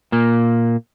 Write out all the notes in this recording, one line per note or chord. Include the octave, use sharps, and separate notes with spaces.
A#2 A#3